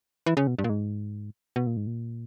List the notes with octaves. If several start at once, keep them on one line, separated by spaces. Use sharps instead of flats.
E3
C#3
B2
G2
A#2
G#2
B2
A#2
G#2
A#2